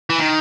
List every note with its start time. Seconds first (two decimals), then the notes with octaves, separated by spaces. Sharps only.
0.10 E3
0.19 D#3